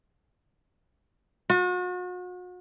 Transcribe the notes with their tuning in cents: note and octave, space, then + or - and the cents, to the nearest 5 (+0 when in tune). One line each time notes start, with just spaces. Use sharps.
F#4 -40